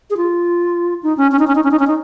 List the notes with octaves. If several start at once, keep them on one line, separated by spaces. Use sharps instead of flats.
G#4
F4
D#4
C#4
C#4
D#4
C#4
D#4
C#4
D#4
C#4
D#4